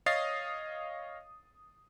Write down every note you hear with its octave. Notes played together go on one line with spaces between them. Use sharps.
C#5 D#5 F5 D#6 A6 C7